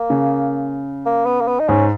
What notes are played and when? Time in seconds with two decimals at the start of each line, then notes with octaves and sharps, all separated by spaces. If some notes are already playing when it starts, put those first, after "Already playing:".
Already playing: A#3
0.10 C#3
1.06 A#3
1.26 B3
1.41 A#3
1.48 B3
1.60 D#4
1.69 G#2 C#4